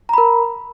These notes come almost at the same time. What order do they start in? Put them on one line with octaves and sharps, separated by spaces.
A#5 B5 A#4